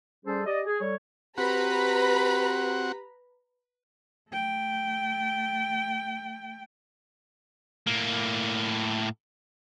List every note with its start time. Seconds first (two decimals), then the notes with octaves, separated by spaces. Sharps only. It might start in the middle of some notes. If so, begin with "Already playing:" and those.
0.25 G3 C#4 G#4 A4 C5
0.46 G4 D5 D#5
0.66 G#4
0.80 G3 A4 C#5
1.38 C4 F#4 G4 B4 F#5 A#5 B5
4.30 A3 G5
7.87 A2 A#3